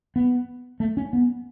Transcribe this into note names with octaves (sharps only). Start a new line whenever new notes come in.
B3
A3
C#4
B3